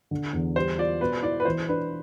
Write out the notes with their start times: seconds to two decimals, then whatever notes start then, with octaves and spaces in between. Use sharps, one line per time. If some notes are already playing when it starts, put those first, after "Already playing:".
0.11 D3
0.33 E2
0.56 G3 C5
0.78 F4 D5
1.01 B2 B4
1.23 E4 D5
1.40 B4
1.45 E3 C5
1.68 D4 B4